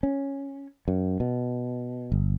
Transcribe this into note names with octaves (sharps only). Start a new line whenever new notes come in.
C#4
F#2
B2
G1